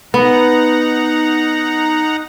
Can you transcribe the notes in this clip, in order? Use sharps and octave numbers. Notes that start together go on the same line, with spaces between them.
B3 D#4 F#5 A#5